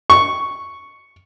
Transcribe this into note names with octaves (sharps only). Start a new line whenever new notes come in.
C#6